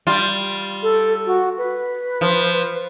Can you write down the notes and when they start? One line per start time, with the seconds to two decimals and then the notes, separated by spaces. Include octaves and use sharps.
0.07 G3 F4
0.83 A4
1.26 F#4
1.58 B4
2.21 F3